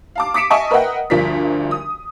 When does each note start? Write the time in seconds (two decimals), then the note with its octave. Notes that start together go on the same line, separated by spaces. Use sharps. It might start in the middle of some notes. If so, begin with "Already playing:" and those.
0.16 F5 A5 D6
0.34 D6 D#6 B6 C#7 D7 E7
0.50 D#5 E5 G#5 A5 C#6 D#6
0.71 A#4 B4 D#5 E5 F#5 G5
1.10 D2 G2 F3 D4 A#4 B6
1.71 D#6